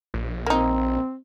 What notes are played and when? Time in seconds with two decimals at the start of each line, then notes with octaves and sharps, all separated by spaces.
0.14 A#1
0.46 A#3 C4 D#4